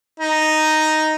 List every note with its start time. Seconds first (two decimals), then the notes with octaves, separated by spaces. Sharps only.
0.20 D#4